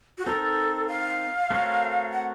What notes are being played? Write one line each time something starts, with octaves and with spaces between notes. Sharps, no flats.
F#4
C4 D#4 A4 A#4
F5
A3 C4 F#4 A#4 C#5
F#5